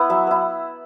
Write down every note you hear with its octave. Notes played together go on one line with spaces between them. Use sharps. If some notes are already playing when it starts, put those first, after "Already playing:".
Already playing: B3 E4 F#5
F#3 E5
B3 E4